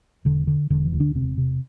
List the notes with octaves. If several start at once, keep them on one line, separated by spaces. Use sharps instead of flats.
E1 D3
D3
E1 D3
E3
D2
D3 D4
E1 C3 C4
C3